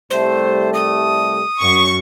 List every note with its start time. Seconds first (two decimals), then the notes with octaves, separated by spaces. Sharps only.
0.10 C2 G3 A3 C5
0.74 D#6
1.60 F#2 C#6